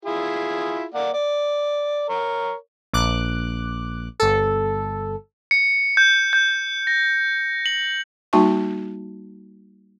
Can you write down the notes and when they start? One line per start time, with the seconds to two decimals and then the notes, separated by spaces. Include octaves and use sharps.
0.05 E4 F4 G#4
0.94 A#3 D5 F#5
1.14 D5
2.09 A#4 C#5
2.93 A#1 D6 F#6
4.20 G1 A4
5.51 C#7
5.97 G6
6.33 G6
6.87 A#6
7.66 F#7
8.33 G3 A#3 D#4 F#4 A5 C#6